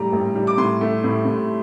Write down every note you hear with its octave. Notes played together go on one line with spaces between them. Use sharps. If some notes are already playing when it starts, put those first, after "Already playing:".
Already playing: A1 G3 A3 A#5
A1
G3
D6
A2 C6
A3
A2
A2